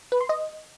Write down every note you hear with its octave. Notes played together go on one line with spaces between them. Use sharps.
B4
C6
D#5